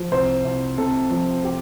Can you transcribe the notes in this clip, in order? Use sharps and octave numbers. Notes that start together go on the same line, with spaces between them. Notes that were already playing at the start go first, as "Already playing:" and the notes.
Already playing: F3
C2 C5
C2
C3 A4
F3
G4